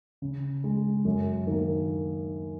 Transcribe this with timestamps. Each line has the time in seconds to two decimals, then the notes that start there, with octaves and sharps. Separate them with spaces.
0.22 C#3
0.64 G#3
1.05 F#2
1.47 D#3 A#3